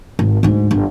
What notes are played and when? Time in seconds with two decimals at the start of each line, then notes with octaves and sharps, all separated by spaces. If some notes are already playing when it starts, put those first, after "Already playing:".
0.19 G#1
0.43 D2 G#2
0.71 G1